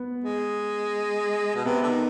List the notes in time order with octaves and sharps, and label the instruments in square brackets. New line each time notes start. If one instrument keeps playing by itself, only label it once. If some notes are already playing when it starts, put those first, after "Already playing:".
Already playing: [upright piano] B3
[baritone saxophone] G#3
B2
[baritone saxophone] C3 [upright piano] B3
[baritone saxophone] D3
D#3